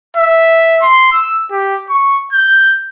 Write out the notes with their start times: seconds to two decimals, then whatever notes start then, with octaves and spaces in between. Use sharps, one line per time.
0.17 E5
0.82 C6
1.13 E6
1.51 G4
1.90 C#6
2.33 G6